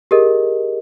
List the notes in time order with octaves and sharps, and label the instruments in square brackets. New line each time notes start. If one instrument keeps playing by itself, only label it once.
[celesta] G4 G#4 A#4 D#5